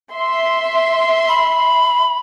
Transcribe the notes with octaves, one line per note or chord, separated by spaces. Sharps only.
E5 C6
B5